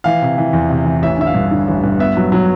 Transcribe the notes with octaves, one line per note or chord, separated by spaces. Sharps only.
E3 F5
C3
E3
E2
C3
E3
A1 E5
D3 E5
F5
G2
D3
A1
G2
B3 E5
F#3
F#3